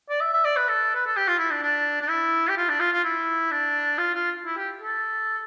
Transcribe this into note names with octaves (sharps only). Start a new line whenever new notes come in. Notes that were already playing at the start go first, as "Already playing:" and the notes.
D5
E5
E5
D5
B4
A4
B4
A4
G4
F4
E4
D4
D4
D4
E4
G4
F4
D4
F4
F4
E4
D4
F4
F4
E4
G4
A4